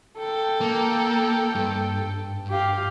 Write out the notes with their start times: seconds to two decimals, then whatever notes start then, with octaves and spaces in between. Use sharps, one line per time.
0.18 A4 G5
0.61 A#3
1.55 G2
2.50 G4 F5